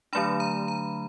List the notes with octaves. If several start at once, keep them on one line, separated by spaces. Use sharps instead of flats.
D3 F#3 A3 D4 B5
A#5
A#5